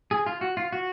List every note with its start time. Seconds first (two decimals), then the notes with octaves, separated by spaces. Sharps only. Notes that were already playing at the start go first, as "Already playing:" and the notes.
0.11 G#4
0.26 F4
0.41 F#4
0.57 F4
0.73 F#4